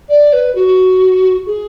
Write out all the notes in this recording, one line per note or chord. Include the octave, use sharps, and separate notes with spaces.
D5
B4
F#4
G#4